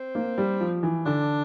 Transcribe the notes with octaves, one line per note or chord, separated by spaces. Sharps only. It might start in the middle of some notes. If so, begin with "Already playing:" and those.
Already playing: C4
A#3
G3
F3
E3
D3 D4